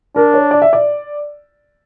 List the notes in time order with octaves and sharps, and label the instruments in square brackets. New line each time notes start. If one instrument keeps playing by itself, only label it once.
[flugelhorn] D4 [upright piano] A#4
[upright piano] C#5
D5
E5
D5